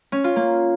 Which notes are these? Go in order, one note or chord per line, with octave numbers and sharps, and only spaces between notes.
C#4
F4
A#3